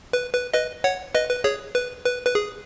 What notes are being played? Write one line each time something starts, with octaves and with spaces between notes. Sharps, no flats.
B4
B4
B4 D#5
C#5 F#5
B4 D#5
B4
G#4 C#5
B4
B4
B4
G#4